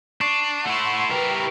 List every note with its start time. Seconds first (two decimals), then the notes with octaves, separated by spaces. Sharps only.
0.21 D4 C#6 C7
0.65 A3 E4 F#5 C6
1.10 E4 G4 A#4 B4